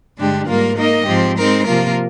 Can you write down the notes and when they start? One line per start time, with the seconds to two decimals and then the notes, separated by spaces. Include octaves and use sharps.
0.17 G2 D3 G#3 D4 G4
0.47 G#2 G3 A#3 F4 A#4
0.77 A#3 D#4 A#4 D#5
1.06 G#2 F3 C4 G4
1.37 G#3 C4 D#4 A#4
1.66 C3 F3 A#3 F4 A#4